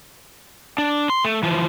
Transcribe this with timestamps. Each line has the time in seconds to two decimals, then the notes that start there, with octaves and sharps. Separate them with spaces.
0.78 D4
1.10 C6
1.25 A3
1.43 E3 F3